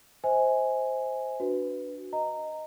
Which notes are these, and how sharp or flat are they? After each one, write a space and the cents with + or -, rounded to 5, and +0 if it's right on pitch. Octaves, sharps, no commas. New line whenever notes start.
C5 +0 D#5 +45 G#5 +0
D4 -5 F#4 +0 B4 +0
D#5 +0 A#5 -15